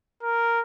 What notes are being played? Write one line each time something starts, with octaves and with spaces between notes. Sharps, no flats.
A#4